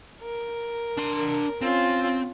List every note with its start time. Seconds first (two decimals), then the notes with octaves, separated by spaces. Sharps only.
0.21 A#4
0.98 D4 C6
1.61 C4 C#4 F4